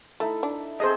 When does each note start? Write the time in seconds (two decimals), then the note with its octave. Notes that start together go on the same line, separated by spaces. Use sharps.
0.20 A3 D#4 E4 A4
0.43 D4
0.80 C4 G#4 A4 C5 D#5